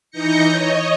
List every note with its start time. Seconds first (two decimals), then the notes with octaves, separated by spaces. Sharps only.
0.11 E3 D#4 G6 A#6 C#7
0.48 C#5 D#5